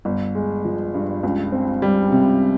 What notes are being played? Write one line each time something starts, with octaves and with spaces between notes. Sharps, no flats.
G1
G#3
F3
G2
C#2
C4
G3
C3